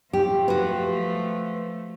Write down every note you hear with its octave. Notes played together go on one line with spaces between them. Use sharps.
F3 A3 G4
F#4 B4